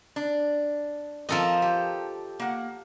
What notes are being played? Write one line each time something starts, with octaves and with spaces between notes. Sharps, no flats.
D4
F3 C4 A4 A#4 C5 D#5
G4
A#3 F#5